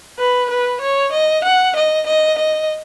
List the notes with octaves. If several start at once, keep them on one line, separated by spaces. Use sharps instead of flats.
B4
B4
C#5
D#5
F#5
D#5
D#5
D#5